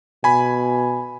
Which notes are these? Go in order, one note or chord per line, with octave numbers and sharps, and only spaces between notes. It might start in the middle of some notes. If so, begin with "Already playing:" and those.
B2 G#5 B5